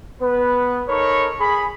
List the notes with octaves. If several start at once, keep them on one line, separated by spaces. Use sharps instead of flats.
B3 B4
D#4 A4 A#4 C#5 B5 C#6
G#4 B5